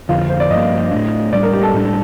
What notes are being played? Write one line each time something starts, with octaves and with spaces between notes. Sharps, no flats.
F2 D3 F3 F4
C5
D5
G2 F3 A#3 D#5
A2 A3 D4
A2 G3 D4 D5
A#4
G4
A4
A2 G3 D4